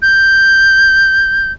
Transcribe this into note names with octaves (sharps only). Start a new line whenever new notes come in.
G6